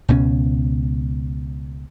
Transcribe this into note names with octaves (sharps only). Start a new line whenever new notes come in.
C#2 B2 A3 C#4